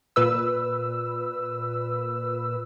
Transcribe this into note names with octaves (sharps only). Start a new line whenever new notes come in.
A#2 B4 E6